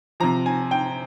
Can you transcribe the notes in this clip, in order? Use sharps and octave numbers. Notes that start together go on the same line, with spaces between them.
C3 F3 A#5
G#5
G5